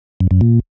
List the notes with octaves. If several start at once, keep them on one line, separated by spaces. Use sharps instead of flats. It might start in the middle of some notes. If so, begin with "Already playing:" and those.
F#2
F#2
A#2